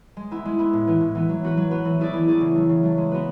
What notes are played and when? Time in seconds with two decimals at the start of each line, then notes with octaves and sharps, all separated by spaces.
0.17 G#3
0.31 B3 E4
0.45 G#3
0.59 B3 E4
0.73 A2
0.87 E3 B3 E4
1.01 A2
1.15 E3 B3 E4
1.29 F#3
1.43 B3 F#4 B4
1.57 F#3
1.71 B3 F#4 B4
1.85 E3
1.99 A3 E4 G#4 D5
2.13 E3
2.28 A3 E4 G#4 D5
2.41 C#3
2.55 F#3 A3
2.69 C#3
2.83 F#3 A3
2.98 G#3
3.11 B3 F#4 B4